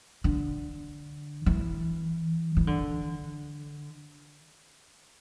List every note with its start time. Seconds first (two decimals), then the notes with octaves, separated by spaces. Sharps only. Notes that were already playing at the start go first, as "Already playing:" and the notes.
0.24 D3
1.46 E3
2.57 E3
2.67 D3